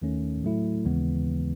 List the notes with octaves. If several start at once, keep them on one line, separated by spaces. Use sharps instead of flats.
D#2 D#3 A3 C#4
A2 F#3 A3 E4
D#2 C#3 E3 G#3 B3